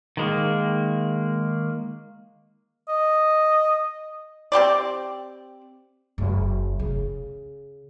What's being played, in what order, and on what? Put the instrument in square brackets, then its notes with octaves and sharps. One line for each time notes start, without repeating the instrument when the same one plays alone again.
[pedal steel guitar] D#3 G#3 A#3
[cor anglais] D#5
[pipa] C4 G4 C5 D5
[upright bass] F#1
C#3